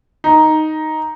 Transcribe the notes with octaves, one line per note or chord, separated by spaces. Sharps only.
D#4